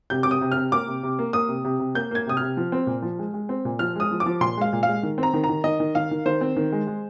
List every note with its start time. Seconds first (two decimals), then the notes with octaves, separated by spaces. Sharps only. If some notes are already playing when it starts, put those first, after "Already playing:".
0.10 C3 G6
0.23 C3 D6
0.31 D#6
0.41 C3
0.52 C3 F6
0.72 A#3 D6
0.87 C3
1.03 C3
1.19 A#3
1.33 A#3 D#6
1.49 C3
1.64 C3
1.79 C3
1.95 A#3 G6
2.11 A#3 G#6
2.27 C3 D#6
2.37 C3 F6
2.57 F3
2.72 C4
2.87 A#2
3.02 F3
3.19 G#3
3.34 G#3
3.49 C4
3.65 A#2
3.79 F3 F6
3.96 G#3 D#6
4.11 F3
4.20 D6
4.26 F3
4.41 A#2 C6
4.57 G#3 F5
4.73 A#2
4.83 F5
4.88 G#3
5.03 D#3
5.18 C4
5.23 A#5
5.34 D#3
5.44 A#5
5.49 D#3
5.64 D#3 D#5
5.80 D#3
5.95 D#3 F5
6.11 D#3
6.26 D#3 C5
6.41 C4
6.56 D#3
6.72 G#3
6.87 G#3